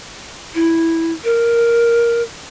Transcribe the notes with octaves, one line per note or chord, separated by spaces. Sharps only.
E4
A#4